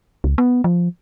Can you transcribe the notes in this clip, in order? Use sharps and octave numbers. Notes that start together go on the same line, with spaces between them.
C#2
B3
F3